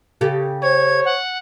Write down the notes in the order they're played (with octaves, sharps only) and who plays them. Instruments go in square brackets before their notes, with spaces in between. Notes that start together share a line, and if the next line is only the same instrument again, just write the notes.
[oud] C#3 G4 A4
[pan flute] C5 [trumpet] C#5 [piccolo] G#6
[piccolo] F#5